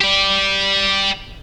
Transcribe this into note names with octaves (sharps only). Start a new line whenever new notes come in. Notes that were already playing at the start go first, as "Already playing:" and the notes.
G4 D5